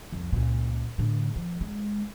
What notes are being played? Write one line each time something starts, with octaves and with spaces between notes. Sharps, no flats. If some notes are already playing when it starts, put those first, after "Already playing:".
C2 F2
C#2 A#2
A2 D3
F3
G#3